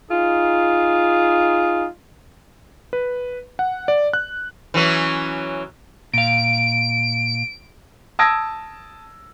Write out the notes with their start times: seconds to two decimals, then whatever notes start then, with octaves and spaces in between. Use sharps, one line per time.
0.11 D#4 F4 G#4
2.93 B4
3.59 F#5
3.88 D5
4.13 F#6
4.74 E3 F#3 C#4
6.13 A#2 F5 D7
8.19 A5 D#6 E6 G#6 A#6 D7